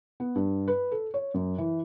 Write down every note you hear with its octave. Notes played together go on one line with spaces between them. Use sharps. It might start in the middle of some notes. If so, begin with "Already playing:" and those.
B3
G2
B4
A4
C#5
F#2
E3